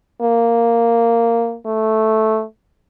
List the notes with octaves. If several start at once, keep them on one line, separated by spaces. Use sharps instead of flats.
A#3
A3